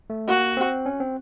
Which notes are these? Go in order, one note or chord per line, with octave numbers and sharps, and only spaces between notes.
A3
A#3 F#4
C4
C#4
C4